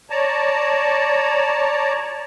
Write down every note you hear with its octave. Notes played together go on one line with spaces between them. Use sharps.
C#5 D5 A5 A#5